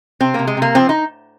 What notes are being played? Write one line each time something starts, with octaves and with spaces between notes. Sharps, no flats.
C3 C4
C3 A#3
G#3
C3 A#3
F3 C4
D#4